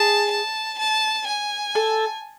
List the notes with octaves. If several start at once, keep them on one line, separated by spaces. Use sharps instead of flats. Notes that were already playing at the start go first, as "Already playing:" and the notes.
Already playing: G#4 A5
A5
A5
G#5
A4